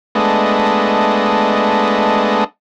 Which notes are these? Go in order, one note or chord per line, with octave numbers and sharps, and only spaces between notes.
G#3 A3 B3 D4 D#5